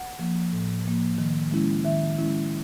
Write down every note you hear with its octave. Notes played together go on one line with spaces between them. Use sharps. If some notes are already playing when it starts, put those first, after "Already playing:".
Already playing: F#5
F3 A#3
A2
F3 A#3
D#3
G#3 C#4 E4
D#3 E5
G#3 C#4 E4